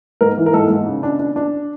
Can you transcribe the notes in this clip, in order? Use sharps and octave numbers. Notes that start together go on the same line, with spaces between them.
G#2 A#4
E3
A#4
G#2 A4
G#2
C#3
D4
D4
D4